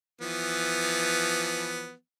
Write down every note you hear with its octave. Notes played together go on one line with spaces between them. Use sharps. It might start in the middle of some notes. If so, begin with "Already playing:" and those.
E3 F3 B3